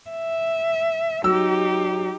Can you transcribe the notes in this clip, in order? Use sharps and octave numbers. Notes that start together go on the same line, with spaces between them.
E5
F#3 D#4 G4 E6